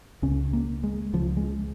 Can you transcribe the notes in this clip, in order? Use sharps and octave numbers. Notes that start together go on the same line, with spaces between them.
C#2 C#3 C#4
A#3
G#3
C#2 C#3 F3
G#3